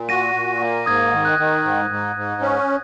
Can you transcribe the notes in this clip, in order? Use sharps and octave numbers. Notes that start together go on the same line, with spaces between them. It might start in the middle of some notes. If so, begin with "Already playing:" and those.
Already playing: A#2
F#4 A#6 D#7
A#2
A#3
G#2 D#6 G#6
D#3
F#6
D#3
G#2
G#2
G#2
C#4